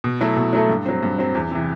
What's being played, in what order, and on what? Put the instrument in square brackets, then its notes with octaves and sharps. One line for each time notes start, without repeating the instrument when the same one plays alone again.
[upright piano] B2
F#3 A3 E4 A4
B2
F#3 A3 E4 A4
G2
F#3 C4
G2
F#3 C4
E2
C3 E3